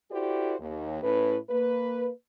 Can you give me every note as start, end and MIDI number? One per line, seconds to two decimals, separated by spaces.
0.11 0.55 64
0.11 0.55 66
0.11 0.55 67
0.11 0.55 69
0.11 0.55 72
0.11 0.55 74
0.60 1.01 39
1.02 1.37 45
1.02 1.37 61
1.02 1.37 64
1.02 1.37 71
1.49 2.09 58
1.49 2.09 71